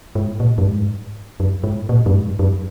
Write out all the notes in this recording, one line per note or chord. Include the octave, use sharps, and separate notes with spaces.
G#2
A#2
F#2
G#2
F#2
G#2
A#2
F#2
G#2
F#2